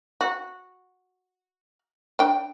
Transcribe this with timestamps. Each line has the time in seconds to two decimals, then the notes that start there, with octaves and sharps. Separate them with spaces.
0.21 F#4
2.19 D4 G5